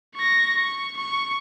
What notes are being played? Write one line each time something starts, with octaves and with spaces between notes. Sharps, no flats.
C#6 A#6
C#6
C#6